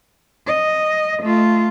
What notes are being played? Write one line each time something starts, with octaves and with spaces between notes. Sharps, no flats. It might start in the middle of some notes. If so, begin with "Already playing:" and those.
D#5
A3 F4